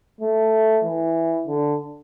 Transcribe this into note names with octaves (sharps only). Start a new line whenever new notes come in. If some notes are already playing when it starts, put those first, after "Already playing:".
A3
E3
D3